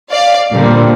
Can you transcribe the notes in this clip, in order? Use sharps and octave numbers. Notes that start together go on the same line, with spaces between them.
D5 F5
A#2 D3 G3 A#3 C4